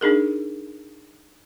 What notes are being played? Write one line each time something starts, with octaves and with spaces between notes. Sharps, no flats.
D4 D#4 G#4 A#4